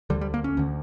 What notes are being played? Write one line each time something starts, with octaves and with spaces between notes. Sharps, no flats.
D2 D3 G3
G3
A#3
C#4
D2 D3